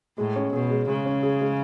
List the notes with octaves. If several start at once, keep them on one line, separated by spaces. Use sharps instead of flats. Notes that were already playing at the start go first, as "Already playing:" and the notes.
A2 G#3
C#4
B2 G#4
G#3
C#3 G#3
C#4
G#4
G#3